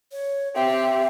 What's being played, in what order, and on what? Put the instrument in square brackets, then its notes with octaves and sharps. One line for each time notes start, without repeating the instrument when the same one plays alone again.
[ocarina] C#5
[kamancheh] C4 G4 [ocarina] E5